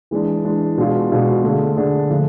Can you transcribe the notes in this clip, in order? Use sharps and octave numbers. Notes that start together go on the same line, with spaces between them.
E3 G#3 D4
E3 G#3 D4
B2 G#3 D4 F4 G#4
B2 G#3 D4 F4 G#4
D3 A3 D4 G#4
D3 A3 D4 G#4
D3 F3 A3